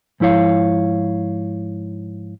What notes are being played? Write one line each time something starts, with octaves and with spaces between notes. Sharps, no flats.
G#2 F3 E4 C#5 F5